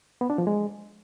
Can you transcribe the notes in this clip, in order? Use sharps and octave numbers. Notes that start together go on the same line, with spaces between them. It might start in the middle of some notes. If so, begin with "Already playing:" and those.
B3
D4
F3
G#3